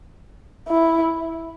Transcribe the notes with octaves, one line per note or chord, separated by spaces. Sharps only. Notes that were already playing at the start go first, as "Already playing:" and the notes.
E4